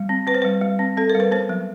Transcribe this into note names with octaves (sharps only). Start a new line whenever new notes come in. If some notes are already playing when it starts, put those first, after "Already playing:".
Already playing: G3
C4
C4 B4
C5
G3 B4
G3
C4
C4 A4
A#4
G3
B4
B3 C5
F#3